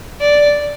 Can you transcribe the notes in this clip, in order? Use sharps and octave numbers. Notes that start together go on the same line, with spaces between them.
D5